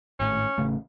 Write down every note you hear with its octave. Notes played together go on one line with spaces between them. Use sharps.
G#1 A2 C#4
A1 C#3 A3